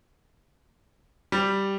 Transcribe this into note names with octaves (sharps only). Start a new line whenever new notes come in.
G3